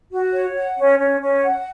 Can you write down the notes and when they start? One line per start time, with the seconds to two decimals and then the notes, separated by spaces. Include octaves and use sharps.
0.12 F#4
0.34 C#5
0.55 F#5
0.78 C#4
1.00 C#4
1.22 C#4
1.44 F#5